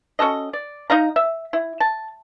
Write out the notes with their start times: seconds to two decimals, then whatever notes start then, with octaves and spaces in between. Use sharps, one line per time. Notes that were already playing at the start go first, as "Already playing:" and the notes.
0.19 C#4 F#4 A4 D#5
0.53 D5
0.90 D#4 D#5 F5 A#5
1.16 E5
1.53 E4
1.80 A5